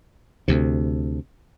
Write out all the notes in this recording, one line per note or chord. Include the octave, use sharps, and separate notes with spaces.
D2 C3